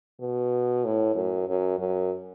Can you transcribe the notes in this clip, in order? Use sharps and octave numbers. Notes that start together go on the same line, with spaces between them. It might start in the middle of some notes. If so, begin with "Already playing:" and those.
B2
A2
F#2
F#2
F#2